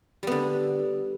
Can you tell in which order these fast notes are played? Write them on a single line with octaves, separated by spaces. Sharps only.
G3 B3 D3